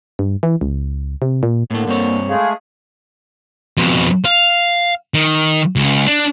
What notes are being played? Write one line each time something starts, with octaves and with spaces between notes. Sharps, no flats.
G2
E3
C#2
C3
A#2
A2 D3 A3 A#3
G2 C4 C#5
G#3 A3 G#4 F5
F2 B2
F5
D#3
C#2
D4